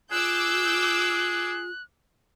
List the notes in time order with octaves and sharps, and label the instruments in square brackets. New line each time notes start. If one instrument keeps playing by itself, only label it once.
[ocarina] F4 [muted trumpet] G#4 [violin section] D6 E6 G6 [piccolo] F#6